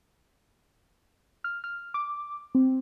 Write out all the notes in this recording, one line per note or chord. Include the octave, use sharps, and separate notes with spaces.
F6
F6
D6
C4